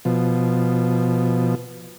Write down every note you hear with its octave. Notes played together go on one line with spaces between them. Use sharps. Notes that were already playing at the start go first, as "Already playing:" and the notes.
B2 F3